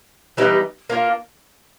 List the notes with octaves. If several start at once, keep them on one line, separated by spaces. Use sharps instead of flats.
E3 G3 B3 D#4
A#3 D4 F4